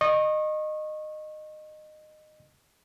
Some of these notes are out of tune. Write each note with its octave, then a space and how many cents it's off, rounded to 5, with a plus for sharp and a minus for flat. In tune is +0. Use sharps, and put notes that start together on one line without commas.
D#5 -20 C#6 -30